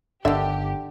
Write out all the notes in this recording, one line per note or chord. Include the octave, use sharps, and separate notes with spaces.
G1 D3 D#3 G4 E5